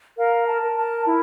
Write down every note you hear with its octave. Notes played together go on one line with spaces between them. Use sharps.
A#4 F5
A5
A#4
A5
E4